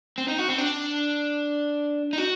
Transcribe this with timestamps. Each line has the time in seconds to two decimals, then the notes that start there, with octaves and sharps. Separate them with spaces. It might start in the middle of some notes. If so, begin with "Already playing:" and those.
0.18 C4
0.28 D#4
0.38 F#4
0.48 C4
0.58 D4
2.13 D#4
2.18 F#4